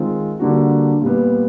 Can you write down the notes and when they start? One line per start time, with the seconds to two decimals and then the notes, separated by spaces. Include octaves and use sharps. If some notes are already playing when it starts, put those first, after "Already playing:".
Already playing: D#3 G#3 C4 F4
0.40 D3 G3 A#3 D4 F#4
1.02 A#2 G3 B3